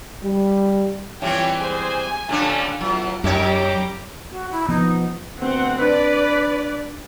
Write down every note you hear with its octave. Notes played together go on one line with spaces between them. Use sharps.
G3
E3 G3 C4 C#4 F4 C#5 G5
G#3 G#4 C5 G#5
A#2 D3 G3 A3 C#4 D4
A2 F#3 B3 F4
F#2 F#3 G3 D#4 G4 C#5 A#5 D6
F#4
E4
F3 B3 D#4
D2 A3 B3 C4 F#5
D4 B4 D5